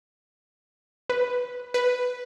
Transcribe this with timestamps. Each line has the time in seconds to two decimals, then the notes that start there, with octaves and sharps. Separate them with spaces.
1.09 B4
1.74 B4